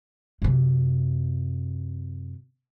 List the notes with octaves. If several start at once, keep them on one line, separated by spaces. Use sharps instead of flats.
F#2 C3